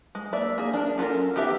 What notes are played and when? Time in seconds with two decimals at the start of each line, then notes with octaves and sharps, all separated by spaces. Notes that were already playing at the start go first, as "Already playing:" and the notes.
0.15 G#3
0.33 A#3 D5 E5
0.58 A#3 G#4
0.73 D4 A#4
0.98 C#4 F4 F#4 A4 A#4
1.36 D#3 B3 G4 E5